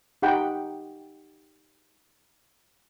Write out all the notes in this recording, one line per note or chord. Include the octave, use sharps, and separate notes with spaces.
D#4 G4 F#5 G5 B5